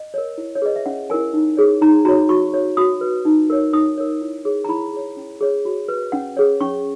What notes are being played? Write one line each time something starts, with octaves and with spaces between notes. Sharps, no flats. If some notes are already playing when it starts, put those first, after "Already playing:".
Already playing: D#5
A#4 C#5
E4
C#5
G#4 B4 D#5
E5
C#4 F#5
E4 A#4 C#5 G#5
D#4
G#4 C#5
D#4 A#5
F#4 C#5 A#5
F#4 C#6
C#5
F#4 D#6
B4
D#4
A#4 C#5
D#4 D#6
A#4 C#5
E4
G#4 C#5
A#5
E4 B5
G#4 C#5
C#4
G#4 C#5
F#4
B4
C#4 F#5
G#4 C#5
C#4 C#6